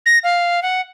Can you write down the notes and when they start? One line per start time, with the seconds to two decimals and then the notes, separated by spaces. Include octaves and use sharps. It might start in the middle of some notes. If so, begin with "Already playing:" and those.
0.06 A#6
0.24 F5
0.63 F#5